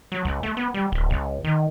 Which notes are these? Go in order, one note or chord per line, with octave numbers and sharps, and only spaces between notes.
F#3
C#2
A3
B3
G3
D1
C#2
D#3